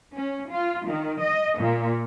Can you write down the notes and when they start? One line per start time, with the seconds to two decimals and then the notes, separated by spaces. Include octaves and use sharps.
0.15 C#4
0.50 F4
0.87 D#3
1.21 D#5
1.58 A#2